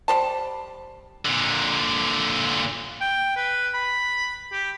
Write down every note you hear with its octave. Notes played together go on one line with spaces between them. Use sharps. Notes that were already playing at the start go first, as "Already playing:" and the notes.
G3 C5 A5
A#2 D3
G5
B4
B5
G4